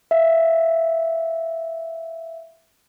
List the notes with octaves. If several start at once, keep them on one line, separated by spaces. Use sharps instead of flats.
E5 F5